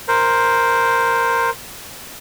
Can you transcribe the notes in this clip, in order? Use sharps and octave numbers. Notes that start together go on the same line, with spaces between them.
A#4 C5